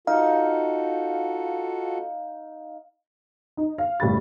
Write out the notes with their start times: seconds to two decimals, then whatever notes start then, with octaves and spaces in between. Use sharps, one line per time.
0.07 D#4 F4 F#4 A4 F5
3.57 D#4
3.78 F5
4.00 F#1 A2 G3 B5 A6